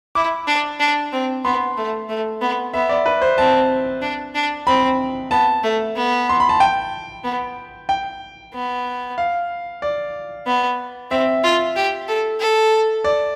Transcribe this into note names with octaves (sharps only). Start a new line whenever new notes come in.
E4 D6
D4
D4
C4
B3 C6
A3
A3
B3
B3 E5
D5
B4
C5
C4 A5
D4
D4
C4 B5
B3 A5
A3
B3
C6
B5
A5
G5
B3
G5
B3
F5
D5
B3
C4 E5
F4
G4
A4
A4
D5